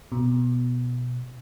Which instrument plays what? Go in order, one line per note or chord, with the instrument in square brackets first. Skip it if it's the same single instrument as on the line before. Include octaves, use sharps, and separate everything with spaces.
[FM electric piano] B2